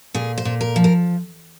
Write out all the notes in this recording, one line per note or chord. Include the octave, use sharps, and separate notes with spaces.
A#2 G#4
C5
A#2
A#4
F3
A#4